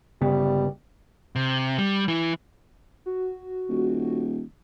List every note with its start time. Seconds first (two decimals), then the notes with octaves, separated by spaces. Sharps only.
0.22 G1 C#3 G3 B3
1.36 C3
1.78 G3
2.08 E3
3.06 F#4
3.69 D#1